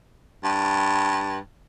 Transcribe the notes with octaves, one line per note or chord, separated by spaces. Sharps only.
G2